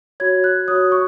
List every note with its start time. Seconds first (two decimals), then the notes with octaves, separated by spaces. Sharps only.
0.20 F#4 C#5 G#6
0.44 F#6
0.68 C#5 D#6
0.71 F#4
0.92 C#6